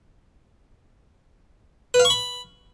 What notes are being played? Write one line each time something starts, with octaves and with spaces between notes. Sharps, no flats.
B4
F5
C#6
B5